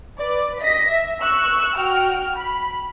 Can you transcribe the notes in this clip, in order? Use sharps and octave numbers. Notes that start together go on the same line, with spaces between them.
B4 D5
D#5 A#6 B6
E5
C#6 E6 F#6
F#4 G5 F6
B5